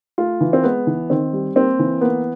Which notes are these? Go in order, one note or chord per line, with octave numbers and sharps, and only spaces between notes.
A3 F4
E3
C4
G#3 B3
E3
D#3 C4
G3
A#3 C4
E3
A#3 B3